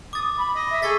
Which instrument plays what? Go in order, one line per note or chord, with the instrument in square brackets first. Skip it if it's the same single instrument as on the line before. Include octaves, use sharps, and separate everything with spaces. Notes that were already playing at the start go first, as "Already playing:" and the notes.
[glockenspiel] D6 A6 [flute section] D#6
[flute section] B5
[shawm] D#5
[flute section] E5
[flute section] G#4 [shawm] A4 [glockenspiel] C#6 A6 B6